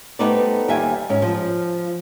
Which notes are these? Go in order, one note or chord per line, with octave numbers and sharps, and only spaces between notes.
G3 A3 B3 D#4 C5 D5
D#2 G3 E5 G#5
G#2 C#4
F3